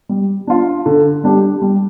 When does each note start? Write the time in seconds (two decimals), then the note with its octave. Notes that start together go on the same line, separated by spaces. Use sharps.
0.09 G3
0.47 D4 F4
0.86 D3
1.24 G3 D4 G4
1.62 G3